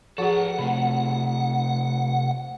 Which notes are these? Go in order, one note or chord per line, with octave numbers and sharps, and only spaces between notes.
F3 F#4 G#4 A4 B4 F#5
C3 A3 C4 B5